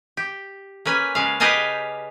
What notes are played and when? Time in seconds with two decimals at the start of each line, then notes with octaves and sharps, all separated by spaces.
0.17 G4
0.85 A#3 C#4 B4 G#5
1.15 C#3 G#3 F5
1.40 G4 B4 D#5 F5 G#5 A5